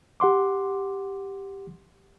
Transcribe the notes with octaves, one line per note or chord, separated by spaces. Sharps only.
G4 F#5 C6 D6